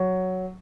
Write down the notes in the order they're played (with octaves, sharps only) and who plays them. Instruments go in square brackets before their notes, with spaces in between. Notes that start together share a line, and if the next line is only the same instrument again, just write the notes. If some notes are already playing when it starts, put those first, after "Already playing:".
Already playing: [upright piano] F#3